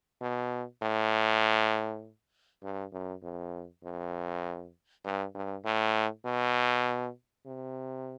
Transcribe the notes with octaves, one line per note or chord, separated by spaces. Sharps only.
B2
A2
G2
F#2
F2
F2
G2
G2
A2
B2
C3